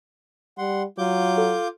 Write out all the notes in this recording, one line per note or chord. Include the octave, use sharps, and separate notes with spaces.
G3 F#5 C6
F#3 F4 D6 G6
A4